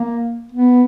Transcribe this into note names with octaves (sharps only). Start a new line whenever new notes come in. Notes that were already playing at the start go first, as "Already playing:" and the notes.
Already playing: A#3
B3